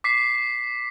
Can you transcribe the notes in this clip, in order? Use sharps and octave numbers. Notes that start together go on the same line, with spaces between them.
D6 B6 C7